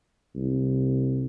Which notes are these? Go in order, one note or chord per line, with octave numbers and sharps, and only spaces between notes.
C2